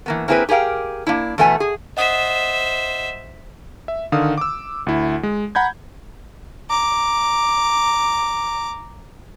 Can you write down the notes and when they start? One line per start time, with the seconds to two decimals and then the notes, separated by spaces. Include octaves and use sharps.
0.06 E3 A#3 B3
0.28 A#3 C4 E4 G#4 A#4 B4
0.49 G4 G#4 A#4 F5 G5
1.07 A#3 D4 E4
1.38 E2 B2 A3 B3 G#5
1.60 G#4
1.97 C5 D#5 E5 F#5 D#6
3.88 E5
4.12 D3 D#3 F5 D#6
4.38 D6 E6
4.87 D2 E4
5.23 G#3
5.55 F#5 A#5 B5 G6 G#6
6.70 A#5 D6